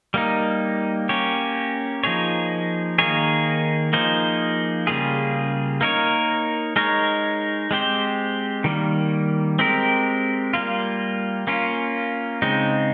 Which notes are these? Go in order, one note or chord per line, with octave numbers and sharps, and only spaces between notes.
G3 A#3 D#4
A#3 C#4 G4 C#5
F3 A#3 D#4 G#4 C#5
D#3 A#3 D#4 G#4 C#5
F3 A#3 D#4 G#4 C5
C#3 G3 A#3 F4 G#4
A#3 D#4 A#4 C#5
G#3 D#4 A#4 C#5
G#3 C4 G4 C5
D#3 G3 A#3
G#3 C4 G4 A#4
G3 A#3 F4
A#3 C#4 F4
C#3 G#3 C4 D#4